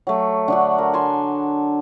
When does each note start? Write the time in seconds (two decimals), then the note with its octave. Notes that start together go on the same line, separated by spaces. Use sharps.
0.07 F#3 A3
0.48 D3 D4 F#4
0.78 A#4
0.94 G#5 A5 C6